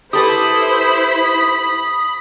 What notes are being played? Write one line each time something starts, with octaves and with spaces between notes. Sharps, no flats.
E4 G4 A4 B4 C5 B5 D#6